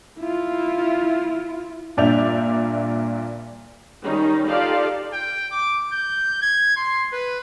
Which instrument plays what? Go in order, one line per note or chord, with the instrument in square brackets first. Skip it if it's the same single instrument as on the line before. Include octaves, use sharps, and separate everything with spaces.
[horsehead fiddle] E4 F4
[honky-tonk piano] G2 A#2 D5 E5 G6 F7
[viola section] D#3 G3 C#4 D#4
D#4 F4 G4 A4 D5 F5
[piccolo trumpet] G5
D6
G6
G#6
C6
B4